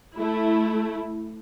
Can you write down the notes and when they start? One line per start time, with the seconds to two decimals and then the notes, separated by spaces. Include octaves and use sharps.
0.15 A3 E4